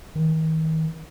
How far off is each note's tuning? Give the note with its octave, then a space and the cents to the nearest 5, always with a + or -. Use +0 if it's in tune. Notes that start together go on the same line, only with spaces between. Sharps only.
D#3 +40